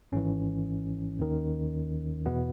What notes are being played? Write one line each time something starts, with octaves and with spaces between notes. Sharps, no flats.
G#1 G#2 E3 C#4
D#2 D#3
E2 B2 B3